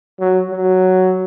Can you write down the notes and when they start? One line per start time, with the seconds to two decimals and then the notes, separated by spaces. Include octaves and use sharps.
0.20 F#3
0.50 F#3